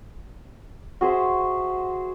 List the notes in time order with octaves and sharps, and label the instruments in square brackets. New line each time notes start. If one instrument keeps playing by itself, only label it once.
[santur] F#4 G#4 C5 E5